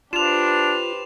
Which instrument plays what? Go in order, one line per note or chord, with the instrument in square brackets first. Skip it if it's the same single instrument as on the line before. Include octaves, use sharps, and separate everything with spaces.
[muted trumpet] D4 [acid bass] F4 [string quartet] G4 B4 C5 [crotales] E7 F7